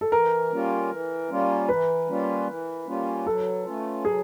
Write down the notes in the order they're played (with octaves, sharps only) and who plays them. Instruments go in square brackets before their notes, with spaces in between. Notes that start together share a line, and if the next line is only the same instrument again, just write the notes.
[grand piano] A4
[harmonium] E3 [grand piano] A#4
[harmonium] G3 A#3 C#4 F4
E3
G3 A#3 C#4 F4
[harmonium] E3 [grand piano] B4
[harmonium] G3 A#3 C#4 F4
E3
G3 A#3 C#4 F4
[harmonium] F#3 [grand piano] A4
[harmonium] A3 C#4 F4
[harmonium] F#3 [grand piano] G#4